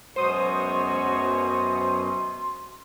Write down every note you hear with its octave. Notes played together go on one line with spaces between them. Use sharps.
F#2 B2 G#3 F#4 C5 C#5 C6 D#6